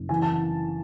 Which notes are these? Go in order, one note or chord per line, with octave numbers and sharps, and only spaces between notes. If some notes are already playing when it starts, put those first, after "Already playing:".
Already playing: F#1
E3 G#5
A5